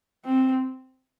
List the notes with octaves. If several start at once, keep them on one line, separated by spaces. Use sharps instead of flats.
C4